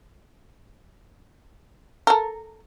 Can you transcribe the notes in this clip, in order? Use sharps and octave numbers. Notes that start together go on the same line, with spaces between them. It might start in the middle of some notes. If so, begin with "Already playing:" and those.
A4 A#4